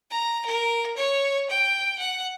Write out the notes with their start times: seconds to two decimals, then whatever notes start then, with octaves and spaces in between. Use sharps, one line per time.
0.10 A#5
0.46 A#4
0.97 C#5
1.49 G5
1.98 F#5